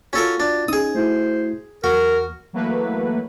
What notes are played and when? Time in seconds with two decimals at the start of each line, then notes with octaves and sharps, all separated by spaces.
0.13 C#4 F4 F#4 A4 A#4
0.40 D4
0.68 C#4 D#4 G#4 D#6
0.95 A3 E4 F#4 C5
1.84 E2 F#4 A#4
2.53 E3 F#3 A3 A#3 B4